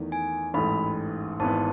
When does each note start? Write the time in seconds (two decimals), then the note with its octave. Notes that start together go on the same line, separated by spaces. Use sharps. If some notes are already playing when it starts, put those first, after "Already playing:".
Already playing: E2 D#3 A3
0.12 G#5
0.54 A1 G#2 E3 A3 B5
1.40 G#1 G#2 E3 B3 A5